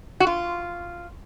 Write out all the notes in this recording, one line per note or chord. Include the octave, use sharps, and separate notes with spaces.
F#4
F4